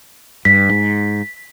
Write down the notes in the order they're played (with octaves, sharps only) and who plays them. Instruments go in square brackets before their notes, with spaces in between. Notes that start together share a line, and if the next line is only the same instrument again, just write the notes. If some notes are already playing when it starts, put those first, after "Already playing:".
[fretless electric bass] G2 [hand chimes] B6
[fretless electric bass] G#2